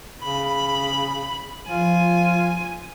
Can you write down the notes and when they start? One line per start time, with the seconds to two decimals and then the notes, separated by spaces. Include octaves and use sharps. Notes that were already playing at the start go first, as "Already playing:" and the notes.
0.23 C#3 B5
1.68 F3 F4 G#5